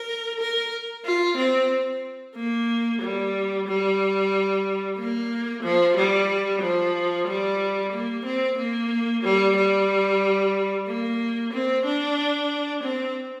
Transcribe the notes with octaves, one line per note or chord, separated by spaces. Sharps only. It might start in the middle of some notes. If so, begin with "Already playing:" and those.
Already playing: A#4
A#4
F4
C4
A#3
G3
G3
A#3
F3
G3
F3
G3
A#3
C4
A#3
G3
G3
A#3
C4
D4
C4